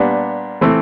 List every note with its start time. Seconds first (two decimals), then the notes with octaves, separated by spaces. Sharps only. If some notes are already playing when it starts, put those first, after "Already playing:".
Already playing: A#2 G3 B3 D4
0.61 E3 A3 C4